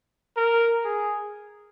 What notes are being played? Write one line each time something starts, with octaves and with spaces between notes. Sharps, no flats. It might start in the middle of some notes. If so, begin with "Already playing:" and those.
A#4
G#4